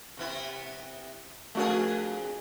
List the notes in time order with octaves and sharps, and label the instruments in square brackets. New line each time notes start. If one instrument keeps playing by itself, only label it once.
[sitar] C3 B3 E4
[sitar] F2 D4 G#4 [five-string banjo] A3 F#4 A#4